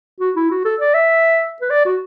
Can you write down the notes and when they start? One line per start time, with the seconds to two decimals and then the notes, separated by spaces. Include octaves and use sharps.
0.20 F#4
0.36 E4
0.51 F#4
0.65 A4
0.81 D5
0.94 E5
1.62 B4
1.70 D5
1.85 F#4